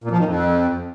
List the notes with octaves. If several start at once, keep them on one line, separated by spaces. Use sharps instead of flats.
A#2
F3
D#3
F2